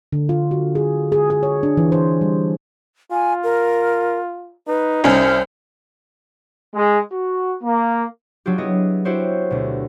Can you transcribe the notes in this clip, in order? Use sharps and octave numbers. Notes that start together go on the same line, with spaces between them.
D3
F4
F#4
G#4
G#4
G#4
C#5
D4
E3
C5
G3
F4 G#5
A#4
D#4 B4
C2 C#4 C5
G#3
F#4
A#3
F#3 D4 F4 G4
B3 E4 G#4 D#5
C4 E4 F#4 G4 C5 C#5
D2 B2